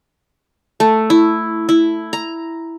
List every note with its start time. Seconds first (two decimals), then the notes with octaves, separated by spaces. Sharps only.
0.80 A3
1.10 E4
1.69 E4
2.13 A#5